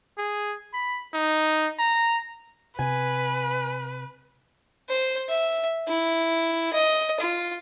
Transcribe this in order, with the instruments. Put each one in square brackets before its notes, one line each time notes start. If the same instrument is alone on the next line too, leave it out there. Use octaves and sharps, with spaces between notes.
[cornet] G#4
B5
D#4
A#5
[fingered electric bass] C3 [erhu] B4 [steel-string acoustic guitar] G#5
[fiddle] C5
E5
E4
D#5
F4